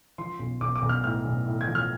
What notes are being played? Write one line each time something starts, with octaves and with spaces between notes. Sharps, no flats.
F3 C6
B1
B1 D6
D6
B1
F6
A2 F6
B1
A2
G#6
F3
F6